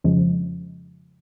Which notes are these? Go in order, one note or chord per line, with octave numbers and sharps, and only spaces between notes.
F2 C#3 F3 G#3